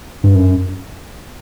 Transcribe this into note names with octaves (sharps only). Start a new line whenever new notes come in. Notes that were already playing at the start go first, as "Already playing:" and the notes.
G2
F#2